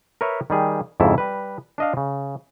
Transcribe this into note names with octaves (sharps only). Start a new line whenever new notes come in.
A#4 B4 C#5 E5
D#3 G3 G#4
F2 G#2 C#3 E4 A5
G3 B4
D4 D#5 F5
C#3